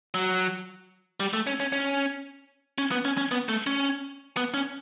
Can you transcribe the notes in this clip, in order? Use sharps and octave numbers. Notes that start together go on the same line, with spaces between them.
F#3
G3
A3
C#4
C#4
C#4
C#4
B3
C#4
C#4
B3
A3
C#4
B3
C#4